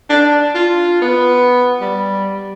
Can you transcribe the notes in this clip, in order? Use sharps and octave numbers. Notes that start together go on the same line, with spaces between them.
D4
F4
B3
G3